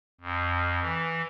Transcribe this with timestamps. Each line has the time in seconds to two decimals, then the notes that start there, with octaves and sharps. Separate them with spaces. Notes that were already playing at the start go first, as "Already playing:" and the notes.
0.21 F2
0.82 E3